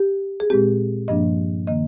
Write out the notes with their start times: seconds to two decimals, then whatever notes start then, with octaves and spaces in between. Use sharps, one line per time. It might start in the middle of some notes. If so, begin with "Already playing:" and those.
Already playing: G4
0.40 G#4
0.50 A#2 G#3 C4 G4
1.08 G2 F3 A#3 D4 D#5
1.67 D#3 A#3 D#5